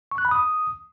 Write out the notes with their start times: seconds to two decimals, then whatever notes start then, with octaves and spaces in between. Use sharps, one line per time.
0.11 C#6
0.18 F#6
0.25 B5
0.31 D#6